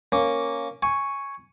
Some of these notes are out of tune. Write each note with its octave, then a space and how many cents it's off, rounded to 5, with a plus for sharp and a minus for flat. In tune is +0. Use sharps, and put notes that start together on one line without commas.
A#3 +0 C#4 +0
G#5 +0 C#6 +0